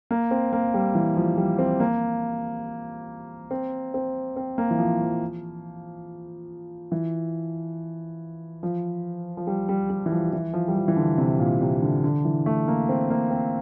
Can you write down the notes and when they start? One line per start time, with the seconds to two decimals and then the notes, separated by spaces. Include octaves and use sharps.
0.11 A#3
0.31 C4
0.53 A#3
0.74 G3
0.95 E3
1.17 F3
1.37 G3
1.59 C4
1.80 A#3
3.51 C4
3.94 C4
4.37 C4
4.58 A#3
4.71 E3
4.79 F3
5.01 F3
6.92 E3
8.63 F3
9.37 F3
9.47 G3
9.69 G3
9.90 G3
10.06 E3
10.12 F3
10.33 E3
10.54 F3
10.68 G3
10.75 F3
10.88 E3
10.97 D3
11.18 C3
11.39 A#2
11.61 C3
11.82 D3
12.04 D3
12.25 E3
12.46 A3
12.68 A#3
12.89 C4
13.10 A#3
13.31 C4